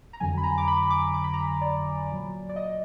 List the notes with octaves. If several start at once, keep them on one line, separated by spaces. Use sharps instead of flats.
A#5
F2 D3 F#3 G#5
B5
A#5
D6
B5
D6
D6
B5
A#5
B5
D5
A#2 F#3
D5
D#5